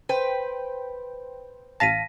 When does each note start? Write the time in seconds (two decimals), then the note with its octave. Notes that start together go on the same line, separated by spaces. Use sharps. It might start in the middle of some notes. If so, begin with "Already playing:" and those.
0.09 B4 C5 G5
1.80 A1 F5 A5 A#6 B6 D#7